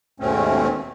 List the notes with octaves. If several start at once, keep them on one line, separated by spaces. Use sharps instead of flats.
D#2 G#2 B2 A3 C4 C#4